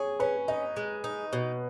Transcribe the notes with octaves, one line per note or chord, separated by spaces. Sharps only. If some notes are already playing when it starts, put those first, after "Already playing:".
Already playing: G#4 C#5
C#4 B4
D#4 D#5
G#3
D#4
B2